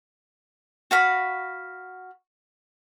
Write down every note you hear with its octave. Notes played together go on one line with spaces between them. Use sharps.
F#4 F5 B5